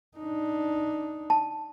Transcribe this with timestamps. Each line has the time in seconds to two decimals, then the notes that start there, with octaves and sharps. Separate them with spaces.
0.17 D4 D#4
1.30 A5